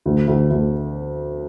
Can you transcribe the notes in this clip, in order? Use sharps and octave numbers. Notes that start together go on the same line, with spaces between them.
D2
D2
D2